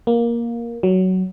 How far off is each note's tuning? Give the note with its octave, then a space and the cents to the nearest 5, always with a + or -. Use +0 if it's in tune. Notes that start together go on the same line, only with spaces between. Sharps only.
A#3 +10
F#3 +10